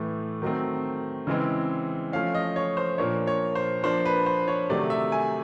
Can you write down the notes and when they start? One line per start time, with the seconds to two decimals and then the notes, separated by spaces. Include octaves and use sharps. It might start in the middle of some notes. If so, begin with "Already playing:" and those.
Already playing: A2 E3 A3
0.42 D#3 F#3 A3 C4
1.27 C#3 E3 G#3 C4
2.12 F3 A3 C#4 F5
2.34 D#5
2.56 C#5
2.77 C5
2.98 A#2 F3 A#3 D4 C#5
3.27 C#5
3.55 C5
3.83 F3 A#3 D4 C5
4.06 B4
4.26 C5
4.48 C#5
4.70 C3 D#3 F#3 A3 D5
4.90 E5
5.12 G#5